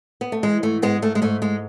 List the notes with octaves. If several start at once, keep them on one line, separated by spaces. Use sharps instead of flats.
B3
A3
E3 G#3
G#2 A3
G#2 G#3 B3
G#2 A3
G#3
G#2 A3
G#2 G#3